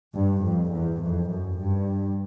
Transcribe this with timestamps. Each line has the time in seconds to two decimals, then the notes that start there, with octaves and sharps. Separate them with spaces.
0.16 G2
0.44 F2
0.72 E2
1.01 F2
1.29 F#2
1.58 G2